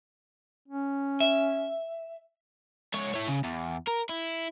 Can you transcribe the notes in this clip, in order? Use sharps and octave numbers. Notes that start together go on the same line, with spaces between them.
C#4
E5
G#2 C#5
E4 C#5
C#3
E2
A#4
E4